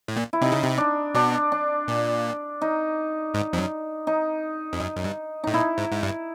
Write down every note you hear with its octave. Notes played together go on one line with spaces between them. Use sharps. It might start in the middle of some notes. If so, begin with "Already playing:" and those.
A2
A#2
E4
C3 D#4
C#3
C3
D4
B2 D4
D4
A#2
D#4
G#2
F2
F#2
D#4
F2
F#2
F#2
G2
A2 D#4
A#2 E4
G#2
G#2
G2